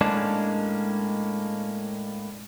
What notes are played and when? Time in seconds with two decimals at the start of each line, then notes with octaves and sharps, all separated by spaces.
0.01 A2 G#3 A#3 C#4 D4 A5